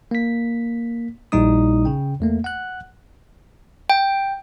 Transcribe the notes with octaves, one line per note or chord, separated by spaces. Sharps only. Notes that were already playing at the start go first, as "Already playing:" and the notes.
A#3 B6
A#1 A#2 G3 D#4 E4 D#6
C#3 G5
E2 A3 A#3
F#5 F#6
G5